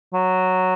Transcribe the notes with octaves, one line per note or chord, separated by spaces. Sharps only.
F#3